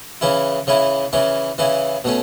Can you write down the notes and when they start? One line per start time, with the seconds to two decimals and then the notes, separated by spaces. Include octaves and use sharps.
0.21 C#3 E3 C#4 E4
0.67 C#3 E3 C#4 E4
1.13 C#3 E3 C#4 E4
1.58 C#3 E3 C#4 E4
2.04 B2 A3 C#4